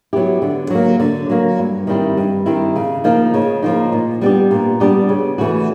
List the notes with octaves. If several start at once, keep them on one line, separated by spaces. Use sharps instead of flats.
F#3 B3 E4 G4
D3
F#3 A#3
D3
F#3 A#3
G2
D#3 G3 C4 E4
G2
D#3 G3 C4 E4
C#3
F3 A#3 D#4
C#3
F3 A#3 D#4
A#2
G3 B3 D4 G4
A#2
G3 B3 D4 G4
C#3
E3 A3 C#4 F#4